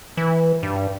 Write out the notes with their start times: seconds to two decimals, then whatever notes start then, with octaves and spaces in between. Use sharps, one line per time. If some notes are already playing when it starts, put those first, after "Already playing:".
0.17 E3
0.63 G2